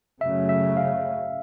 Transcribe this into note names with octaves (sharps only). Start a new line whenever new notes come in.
F#2 C#3 F#3 A3 C#4 E5
E5
F5